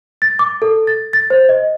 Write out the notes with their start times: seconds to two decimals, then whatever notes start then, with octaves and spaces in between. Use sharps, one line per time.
0.22 A6
0.39 D6
0.62 A4
0.87 A6
1.13 A6
1.30 C5
1.49 D#5